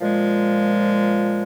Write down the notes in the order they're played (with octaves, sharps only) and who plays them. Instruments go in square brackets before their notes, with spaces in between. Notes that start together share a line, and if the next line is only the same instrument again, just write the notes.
[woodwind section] A#2 F3 G#3